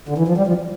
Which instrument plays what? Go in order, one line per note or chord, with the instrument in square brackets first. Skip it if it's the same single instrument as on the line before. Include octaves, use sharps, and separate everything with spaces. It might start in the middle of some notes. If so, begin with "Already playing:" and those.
[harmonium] D3
E3
F3
G3
F3